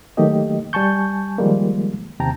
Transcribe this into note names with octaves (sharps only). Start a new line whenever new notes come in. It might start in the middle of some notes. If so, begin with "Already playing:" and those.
D#3 F#3 A3 A#3 G4 D#5
G3 G#5 A5 C#6 G6
D#3 F3 G3 G#3 A#3
D#2 C3 G5 A5 A#5